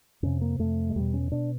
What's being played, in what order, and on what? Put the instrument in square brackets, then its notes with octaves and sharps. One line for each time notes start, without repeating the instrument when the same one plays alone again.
[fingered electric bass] F2 C3 C#4
A#3
F2 C3 A3
G#3
E2 B2 G3
C#4
B2 D4